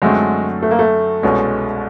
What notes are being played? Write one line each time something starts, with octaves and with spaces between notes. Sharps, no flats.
F#2 D3 F#3 G#3 A3 C4
A3
A#3
A3
C2 B2 G#3 C#4